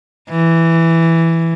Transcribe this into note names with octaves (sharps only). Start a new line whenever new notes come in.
E3